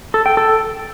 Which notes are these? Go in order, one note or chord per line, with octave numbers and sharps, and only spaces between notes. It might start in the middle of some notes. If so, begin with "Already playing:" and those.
A4
G5
A4